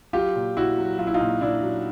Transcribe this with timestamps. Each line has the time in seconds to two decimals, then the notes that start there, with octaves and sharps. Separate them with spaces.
0.13 F#3 F4 G4
0.36 A#2
0.57 A#2 E4 F#4
0.78 F#3
0.98 F#3 F4
1.07 E4
1.14 D#4 F4
1.21 A#2
1.41 A#2 D4 E4
1.63 F#3